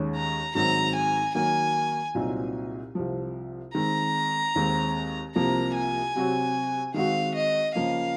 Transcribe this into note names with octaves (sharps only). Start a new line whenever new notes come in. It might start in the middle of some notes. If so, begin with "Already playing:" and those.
Already playing: D#2 D#3 G#3 C#4
A#5
G#2 D#3 F#3 C4 D#4 A#5
G#5
D#3 F#3 A#3 G#5
C2 A#2 F#3 C4 D#4
C2 C3 F3
D#3 G#3 C4 A#5
D#2 D#3 G#3 C4
C2 C3 F3 A#3 A#5
G#5
C3 F#3 C4 F#4
D#3 G#3 C4 F#4 F5
D#5
C#3 F3 A#3 F5